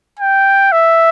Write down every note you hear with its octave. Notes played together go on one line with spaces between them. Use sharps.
G5
E5